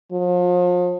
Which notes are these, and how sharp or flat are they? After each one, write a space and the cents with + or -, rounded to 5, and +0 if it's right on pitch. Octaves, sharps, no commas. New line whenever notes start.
F3 +35